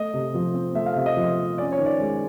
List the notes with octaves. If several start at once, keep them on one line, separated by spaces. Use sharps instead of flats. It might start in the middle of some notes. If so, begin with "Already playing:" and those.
Already playing: A3 D#5
C3
F3
C4
A3 E5
F5
C3 E5
D#5
F3
C4
C#4 D5
C#5
D#3
D5
G#3